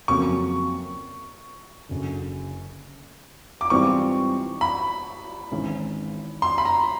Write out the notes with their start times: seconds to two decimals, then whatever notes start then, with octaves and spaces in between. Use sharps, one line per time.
0.08 F2 C#3 F#3 A#3 C#4 C#6
1.89 F#1 F#2 D3
3.61 D6
3.70 G#2 E3 G3 C4 F4 C#6
4.61 B5
5.52 G#1 G#2 E3 G#3 C#4
6.42 C6
6.58 B5
6.65 A#5